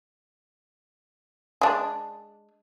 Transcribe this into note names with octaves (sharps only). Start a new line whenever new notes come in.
G#3 D4